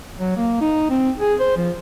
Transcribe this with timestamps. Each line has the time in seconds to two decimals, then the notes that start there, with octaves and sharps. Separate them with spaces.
0.20 F#3
0.37 A#3
0.61 D#4
0.90 C4
1.19 G#4
1.40 C5
1.57 F3